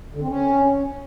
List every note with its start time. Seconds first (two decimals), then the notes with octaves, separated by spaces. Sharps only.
0.14 D3
0.22 C4
0.29 C#4